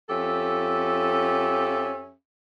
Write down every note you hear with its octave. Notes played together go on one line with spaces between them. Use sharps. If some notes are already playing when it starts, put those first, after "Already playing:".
F2 F3 C#4 G4 A4 E5